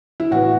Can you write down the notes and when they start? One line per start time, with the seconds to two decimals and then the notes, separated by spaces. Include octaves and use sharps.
0.20 E4
0.31 A2 E3 B3 F#4